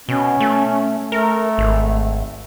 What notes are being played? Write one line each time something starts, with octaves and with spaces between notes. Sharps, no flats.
B2 C#4
A3
A3 A#4
G#1